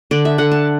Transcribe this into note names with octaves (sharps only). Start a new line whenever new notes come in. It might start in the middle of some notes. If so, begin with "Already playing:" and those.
D3 D5
E5
D3 F#5
A5